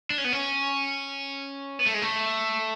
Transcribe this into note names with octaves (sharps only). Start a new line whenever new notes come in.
D4
C#4
B3
C#4
B3
A3
G#3
A3